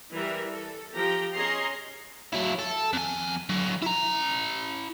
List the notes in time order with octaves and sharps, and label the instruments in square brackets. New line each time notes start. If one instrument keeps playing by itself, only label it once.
[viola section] E3 G3 A#4 E5
A4
F3 G4 G5 A#5
C#4 G#4 C#5 D#5 A#5 C6
[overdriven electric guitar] F#3 E4
A4
F2 G#5
D3 F#3
E4 A#5